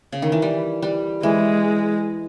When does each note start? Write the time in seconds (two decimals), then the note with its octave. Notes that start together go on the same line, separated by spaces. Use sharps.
0.12 C#3
0.22 D#3
0.32 E3
0.42 G3
0.82 G3
1.23 E3 G#3